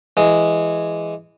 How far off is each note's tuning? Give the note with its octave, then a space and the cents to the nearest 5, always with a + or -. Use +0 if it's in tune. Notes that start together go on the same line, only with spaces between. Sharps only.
E3 +15 G#3 +0